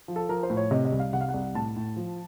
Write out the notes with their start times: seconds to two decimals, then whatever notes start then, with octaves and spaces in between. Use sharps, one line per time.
0.08 F3
0.16 A4
0.29 F3 A#4
0.43 C5
0.50 A2
0.57 C#5
0.71 C3 D#5
0.85 D#5
0.92 C2
0.99 F5
1.13 C3 F#5
1.21 F5
1.28 F#5
1.34 C2
1.55 A2 A5
1.76 A2
1.97 F3